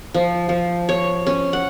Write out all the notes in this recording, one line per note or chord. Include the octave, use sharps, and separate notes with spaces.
F3
F3
C#5
C#4
F#5